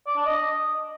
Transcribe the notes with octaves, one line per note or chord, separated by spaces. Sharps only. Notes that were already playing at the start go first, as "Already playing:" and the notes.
D5
D4
D#5